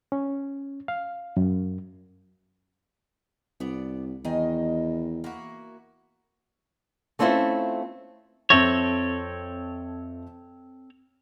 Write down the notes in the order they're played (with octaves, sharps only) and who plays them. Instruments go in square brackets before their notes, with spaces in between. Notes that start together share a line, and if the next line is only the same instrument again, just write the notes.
[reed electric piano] C#4
F5
F#2
[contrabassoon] C2 [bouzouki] B3 D5
[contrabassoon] E2 [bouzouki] D#3 D#5 G#5
[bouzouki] A#3 E4 F#4
[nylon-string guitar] A3 C4 C#4 E4 F4 C5
[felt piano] F2 E5 A#6 [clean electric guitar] C4 A4 C#5